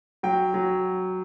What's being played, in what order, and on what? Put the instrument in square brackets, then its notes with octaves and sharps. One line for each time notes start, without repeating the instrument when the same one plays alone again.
[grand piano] F#3 G5
F#3